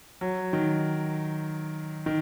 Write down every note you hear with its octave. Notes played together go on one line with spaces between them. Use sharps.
F#3
D#3
D#3